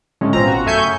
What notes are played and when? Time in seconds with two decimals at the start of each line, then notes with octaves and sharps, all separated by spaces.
0.21 A2 D3 G3 G#3 C#4
0.33 A1 B2 C4 F4 A#5
0.48 F#4
0.66 F#2 A3 E5 G#5 C#6 G6
0.82 C#3